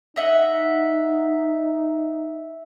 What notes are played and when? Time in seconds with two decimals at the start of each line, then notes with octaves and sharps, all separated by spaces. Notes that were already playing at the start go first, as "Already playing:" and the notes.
0.16 D#4 D#5 E5 F#5